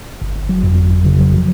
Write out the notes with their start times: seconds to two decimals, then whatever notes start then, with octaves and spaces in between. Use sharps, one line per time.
0.22 G1
0.36 G1
0.49 F#3
0.63 F2
0.78 G1
0.92 G1
1.05 C#3
1.20 F#3
1.34 F3